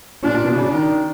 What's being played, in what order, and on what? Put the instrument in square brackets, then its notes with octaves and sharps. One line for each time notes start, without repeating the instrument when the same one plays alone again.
[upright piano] A#2 [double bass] D4
[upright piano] A#2
B2
[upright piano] C#3 [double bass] D4
[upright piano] D#3